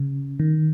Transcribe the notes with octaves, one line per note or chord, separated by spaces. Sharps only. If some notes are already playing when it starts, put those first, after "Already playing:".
Already playing: C#3
D#3